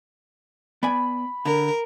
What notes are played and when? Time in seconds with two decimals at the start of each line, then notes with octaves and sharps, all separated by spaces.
0.83 B3 D5 G#5 B5
1.46 D3 A#4